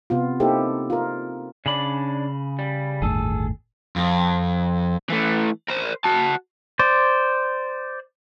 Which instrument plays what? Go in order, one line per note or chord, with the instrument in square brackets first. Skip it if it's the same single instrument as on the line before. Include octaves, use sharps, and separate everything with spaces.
[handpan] C3 B3 F4
A#3 C4 D#4 E4 G4 A4
F4 A#4
[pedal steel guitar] C#3 B5 [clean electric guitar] C#4 D4 D5
[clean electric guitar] G3
[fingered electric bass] G1 D#2 A2 [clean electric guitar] G#4 A4
[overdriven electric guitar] F2
E3 A3
A#4 C5
F#4 A5
[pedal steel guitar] C5 D5